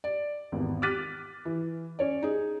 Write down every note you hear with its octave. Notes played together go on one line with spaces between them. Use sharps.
D5
G#1 E2
D6 F6 F#6 A6 B6 D#7
E3
C#4 C#5 D5
D#4 G#4